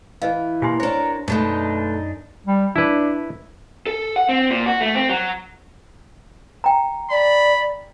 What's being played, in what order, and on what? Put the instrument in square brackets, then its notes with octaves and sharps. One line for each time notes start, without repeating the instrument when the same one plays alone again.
[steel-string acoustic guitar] E3 [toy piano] B4 D#5 F5
[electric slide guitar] B2 A#3 [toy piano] G4 G#5 C6
[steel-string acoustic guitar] D4 C#5 [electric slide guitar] A#4 [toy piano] C5
[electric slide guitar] F#2 D4 D#4 [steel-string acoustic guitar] B2 G#3 A3
[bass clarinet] G3
[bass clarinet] D4 [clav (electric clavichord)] E4 B4
[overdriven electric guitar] A4
F#5
C4
A#2
F#4
A3
C4
F#3
[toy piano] G5 A#5
[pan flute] D5 [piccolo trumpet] B5